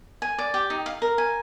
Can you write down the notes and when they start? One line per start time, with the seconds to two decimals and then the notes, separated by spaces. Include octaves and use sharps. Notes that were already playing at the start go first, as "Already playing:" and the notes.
0.22 G#5
0.38 D5
0.54 G4
0.70 D#4
0.86 F5
1.02 A#4
1.18 G#5